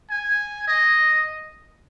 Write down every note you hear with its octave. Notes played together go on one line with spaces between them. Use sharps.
G#5
D#5